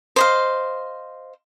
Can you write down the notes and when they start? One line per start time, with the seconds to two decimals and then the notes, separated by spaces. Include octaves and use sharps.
0.16 C5 D#5 F5